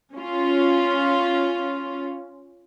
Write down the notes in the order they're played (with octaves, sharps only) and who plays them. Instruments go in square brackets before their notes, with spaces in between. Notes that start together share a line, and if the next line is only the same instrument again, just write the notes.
[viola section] C#4 F4